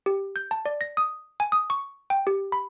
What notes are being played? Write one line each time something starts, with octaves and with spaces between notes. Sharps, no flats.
G4
G6
A5
D5
A#6
D#6
G#5
D#6
C#6
G5
G4
B5